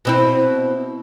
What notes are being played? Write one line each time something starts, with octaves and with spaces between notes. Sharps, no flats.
B2 C4 E4